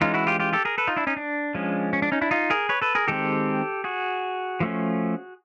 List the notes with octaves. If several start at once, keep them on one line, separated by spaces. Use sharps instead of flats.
E3 G#3 C#4 D#4 F4
E4 F#4
F4 G4
F4 G4
G4 A4
G#4 A#4
A4 B4
D#4 F4
D4 E4
C#4 D#4
D4
F3 G#3 C#4
C#4
D4
C#4 D#4
D4 E4
D#4 F4
G#4 A#4
B4 C#5
A4 B4
G#4 A#4
D#3 G#3 C4 G4 A4
F#4 G#4
F3 A3 C#4